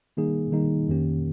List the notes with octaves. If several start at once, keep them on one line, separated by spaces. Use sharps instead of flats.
D#3 G3 A#3 D#4 G#4
D#3 G3 A#3 D#4 G#4
F2 D#3 A#3 C#4 G4